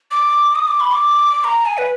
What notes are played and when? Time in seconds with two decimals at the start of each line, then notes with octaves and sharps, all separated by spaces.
0.11 D6
0.56 D#6
0.67 D6
0.80 B5
0.93 D6
1.44 A#5
1.66 G#5
1.78 B4